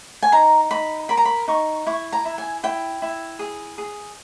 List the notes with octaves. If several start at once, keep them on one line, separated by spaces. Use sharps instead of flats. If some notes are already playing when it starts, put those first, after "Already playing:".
G#5
D#4 A#5
D#4 B5
A#4 B5
A#5
B5
D#4 C#6
E4 C#6
A#5
E4
G#5
E4 G5
E4
G#4
G#4